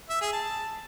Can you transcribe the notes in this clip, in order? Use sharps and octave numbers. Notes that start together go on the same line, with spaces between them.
E5
G#4
A5